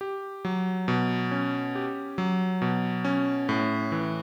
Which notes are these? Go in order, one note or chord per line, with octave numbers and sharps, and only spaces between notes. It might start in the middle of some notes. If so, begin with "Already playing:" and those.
G4
F#3
B2
C#4
G4
F#3
B2
C#4
A2
E3